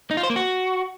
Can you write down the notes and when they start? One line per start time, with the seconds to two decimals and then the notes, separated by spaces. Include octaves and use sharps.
0.11 D#4
0.17 F4
0.23 C5
0.30 A#3
0.36 F#4